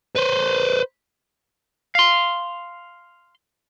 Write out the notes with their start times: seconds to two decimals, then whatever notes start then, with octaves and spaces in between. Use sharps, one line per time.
0.16 B4 C5
1.95 F5 C6